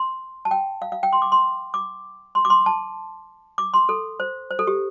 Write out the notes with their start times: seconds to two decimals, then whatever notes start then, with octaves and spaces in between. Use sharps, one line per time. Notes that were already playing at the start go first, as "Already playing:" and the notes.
Already playing: C6
0.45 A5
0.51 G5
0.82 F5
0.92 F5
1.03 G5
1.13 C6
1.22 D6
1.32 C6
1.74 D6
2.35 C6
2.45 D6
2.50 C6
2.66 A5
3.58 D6
3.74 C6
3.89 A4
4.20 C5
4.51 C5
4.59 A4
4.67 G4